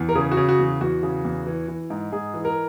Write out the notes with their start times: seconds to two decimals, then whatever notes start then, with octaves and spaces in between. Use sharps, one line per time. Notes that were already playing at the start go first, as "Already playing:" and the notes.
Already playing: E2
0.09 A#4
0.15 C#3 G#4
0.31 F#4
0.37 C#3
0.49 F#4
0.59 E2
0.81 E2 F#4
1.03 C#3
1.24 E2
1.47 E3
1.68 E3
1.90 G#2
2.12 G#2 G#4
2.34 E3
2.45 A#4